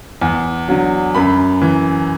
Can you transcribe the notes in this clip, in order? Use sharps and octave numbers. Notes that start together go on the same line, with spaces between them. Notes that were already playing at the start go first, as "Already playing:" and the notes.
E2
D3 F#3
F#2 B5
E3